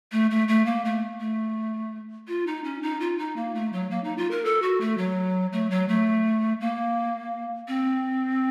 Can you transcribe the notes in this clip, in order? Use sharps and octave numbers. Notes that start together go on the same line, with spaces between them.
A3
A3
A3
A#3
A3
A3
F4
D#4
C#4
D#4
F4
D#4
A#3
A3
F#3
A#3
D#4
F4
A#4
A4
F#4
A3
F#3
A3
F#3
A3
A#3
C4